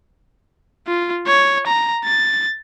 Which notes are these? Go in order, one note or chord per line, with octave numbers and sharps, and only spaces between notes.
F4
C#5
A#5
A6